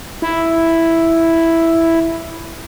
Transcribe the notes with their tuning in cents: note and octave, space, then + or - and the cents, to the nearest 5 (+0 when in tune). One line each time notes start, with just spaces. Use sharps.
E4 +0